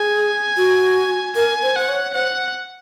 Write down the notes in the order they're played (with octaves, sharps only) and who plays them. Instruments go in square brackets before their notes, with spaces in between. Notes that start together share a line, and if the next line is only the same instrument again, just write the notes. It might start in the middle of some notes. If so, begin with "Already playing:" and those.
Already playing: [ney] G#4 [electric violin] G#5
[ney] F#4
[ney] A#4 [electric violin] G#5
[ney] C5
[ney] C5 [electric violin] F#5
[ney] C#5
[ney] C5 [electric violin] F#5